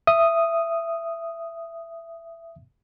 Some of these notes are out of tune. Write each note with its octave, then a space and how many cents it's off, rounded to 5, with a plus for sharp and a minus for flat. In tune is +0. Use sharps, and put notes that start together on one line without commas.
E5 +15 D#6 +0